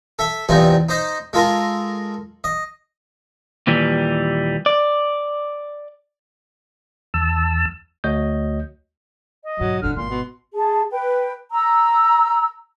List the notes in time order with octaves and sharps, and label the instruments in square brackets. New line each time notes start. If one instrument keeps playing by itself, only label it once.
[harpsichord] A4 E5
E2 G2 C3 D#4 F4 G#5
D#4 C5 D#5
G#3 F4 A4 A#4 G#5
D#5
[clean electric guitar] D#2 A#2 E3 G3
D5
[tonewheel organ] E2 A5 E6
[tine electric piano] D2 A3 F#4 C#5 D#5 G6
[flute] D#5
[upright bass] B1 G#2 [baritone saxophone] F#3
[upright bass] G1 A2 [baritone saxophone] D3 [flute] F6
[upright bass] G#1 E4 [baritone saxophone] A#2 [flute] C6
[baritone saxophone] B2
[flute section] G#4 A5
B4 G5
A#5 E6